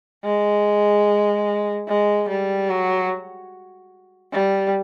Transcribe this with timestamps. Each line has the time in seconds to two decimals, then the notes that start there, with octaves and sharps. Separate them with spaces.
0.24 G#3
1.88 G#3
2.29 G3
2.69 F#3
4.33 G3